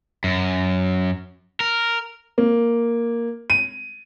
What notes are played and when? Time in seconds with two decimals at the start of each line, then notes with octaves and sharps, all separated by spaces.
0.24 F#2
1.60 A#4
2.38 A#3
3.50 D#7